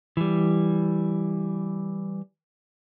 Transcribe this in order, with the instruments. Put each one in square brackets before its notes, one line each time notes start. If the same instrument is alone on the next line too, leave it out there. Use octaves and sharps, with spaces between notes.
[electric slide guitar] E3 G3